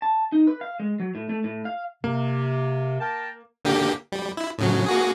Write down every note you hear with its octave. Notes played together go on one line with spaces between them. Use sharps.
A5
D#4
B4
F5
G#3
F#3
A2
A3
A2
F5
C3 A#3
A#4 G5 A5
D3 A#3 G4
G3
E4
A2 C#3 F#3
A#3 F#4 G#4